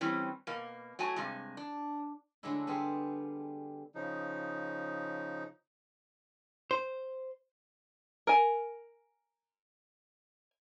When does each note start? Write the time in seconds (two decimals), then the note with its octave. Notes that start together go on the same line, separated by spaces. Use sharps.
0.01 E3 G3 C4 C#4
0.47 B2 A#3
0.99 F#3 A3 F#4 G#5 A5
1.16 G2 C3 G#3
1.57 D4
2.43 D3 F#3 G#3 A3 D4 E4
2.67 G3 B3 F4 G4 G#4
3.95 C#3 F3 D#4
6.71 C5
8.27 A#4 G#5